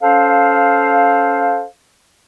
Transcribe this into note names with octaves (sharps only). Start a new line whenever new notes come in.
C#4 A4 C5 F5